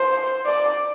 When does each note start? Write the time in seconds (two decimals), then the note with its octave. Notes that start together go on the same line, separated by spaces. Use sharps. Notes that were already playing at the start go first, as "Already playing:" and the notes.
Already playing: C5
0.46 D5